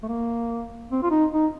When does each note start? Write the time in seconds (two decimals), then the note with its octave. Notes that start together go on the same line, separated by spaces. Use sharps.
0.03 A3
0.08 A#3
0.91 C4
1.03 F4
1.11 D#4
1.32 D#4